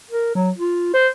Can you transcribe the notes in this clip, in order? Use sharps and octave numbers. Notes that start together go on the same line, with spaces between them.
A#4
F#3
F4
C5